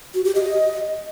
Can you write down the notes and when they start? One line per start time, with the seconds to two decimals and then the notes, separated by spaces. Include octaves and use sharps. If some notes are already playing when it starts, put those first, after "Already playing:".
0.14 F#4
0.25 G4
0.35 D#5